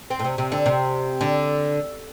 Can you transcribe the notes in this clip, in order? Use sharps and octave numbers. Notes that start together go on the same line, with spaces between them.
C4
A2
C3
C3
D3
C3
D3